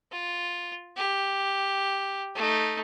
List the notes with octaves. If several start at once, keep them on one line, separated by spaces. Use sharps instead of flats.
F4
G4
A3 D#4